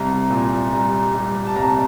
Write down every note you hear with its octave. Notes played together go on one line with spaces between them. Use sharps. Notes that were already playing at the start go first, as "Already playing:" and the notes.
Already playing: C2 A#5
A#2
G3 A#5
G3
A5
C2 A#5